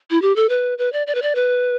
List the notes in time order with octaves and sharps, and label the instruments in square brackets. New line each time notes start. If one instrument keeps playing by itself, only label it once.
[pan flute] E4
G4
A4
B4
B4
D5
D5
B4
D5
B4